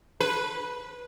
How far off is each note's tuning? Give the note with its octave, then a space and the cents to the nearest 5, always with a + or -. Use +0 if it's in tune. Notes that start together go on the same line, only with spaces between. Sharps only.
B4 -15